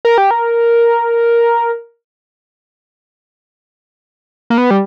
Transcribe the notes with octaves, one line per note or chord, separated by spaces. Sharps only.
A#4
G4
A#4
A#3
B3
G3